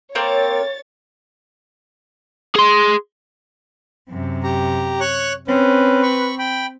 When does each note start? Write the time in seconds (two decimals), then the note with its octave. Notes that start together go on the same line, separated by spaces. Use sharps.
0.15 A#3 C4 A#4 C#5 A6
2.56 G#4 C6
4.10 F#2 C3
4.44 G4 A#5
5.00 C#5 C#6 F#6
5.48 C4 C#4 B4
6.02 B5 C#6
6.39 G5 B5